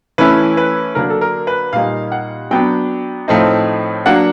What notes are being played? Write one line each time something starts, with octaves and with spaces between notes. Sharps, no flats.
E3 A3 C#4 E4 B4
B4
D3 F#3 A#3 D4 A#4
A4
A#4
B4
A#2 G3 A#3 D#4 F5
F#5
F#3 B3 D4 G5
A2 F3 A3 C4 D#4
F#3 A#3 D4 F#5